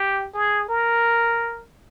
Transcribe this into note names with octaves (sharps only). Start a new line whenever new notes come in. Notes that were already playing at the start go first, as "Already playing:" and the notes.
Already playing: G4
G#4
A#4